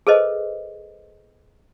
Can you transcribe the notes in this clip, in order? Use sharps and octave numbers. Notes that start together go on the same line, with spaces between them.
G#4 A4 B4 C5 D#5